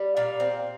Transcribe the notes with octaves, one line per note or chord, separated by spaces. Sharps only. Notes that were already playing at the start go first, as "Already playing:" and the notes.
Already playing: G3
A#2 F5
C4